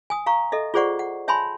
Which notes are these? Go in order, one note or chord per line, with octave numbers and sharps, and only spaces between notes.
G#5 D#6
F5 A#5 C#6
A4 D#5 E5
F4 G#4 C5 D5 F#5 C#6
F#5
C#5 E5 G#5 A5 B5 C6